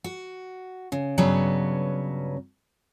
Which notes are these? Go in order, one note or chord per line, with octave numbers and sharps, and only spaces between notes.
F#4
C#3
G2 C#3 F#3 B3 C#4